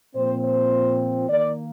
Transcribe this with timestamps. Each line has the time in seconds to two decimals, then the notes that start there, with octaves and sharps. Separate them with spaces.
0.15 A#2 F3 C4 C5
0.45 C5
1.29 D#3 A#3 D5